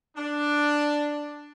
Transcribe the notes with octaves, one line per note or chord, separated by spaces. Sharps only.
D4